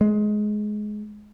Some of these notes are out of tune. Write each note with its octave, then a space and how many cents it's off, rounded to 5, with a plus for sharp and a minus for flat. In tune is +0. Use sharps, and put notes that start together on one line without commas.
G#3 +20